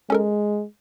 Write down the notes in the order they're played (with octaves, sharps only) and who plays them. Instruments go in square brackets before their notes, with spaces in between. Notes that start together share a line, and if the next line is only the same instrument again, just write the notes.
[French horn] G#3 [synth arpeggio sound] C#4 A4 A#4